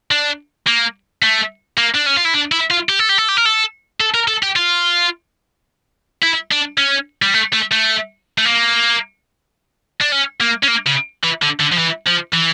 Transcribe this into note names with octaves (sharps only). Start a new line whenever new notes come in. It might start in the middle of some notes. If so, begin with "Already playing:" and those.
D4
A#3
A3
A#3
D4
C#4
F4
E4
D4
E4
F4
G4
A4
G4
A4
G4
A#4
A4
A4
A#4
A4
G4
F4
E4
D4
C#4
G3
A3
A3
A3
A3
A#3
D4
C#4
A#3
C#4
A#3
C#3
E3
D3
D3
F3
E3
F3
E3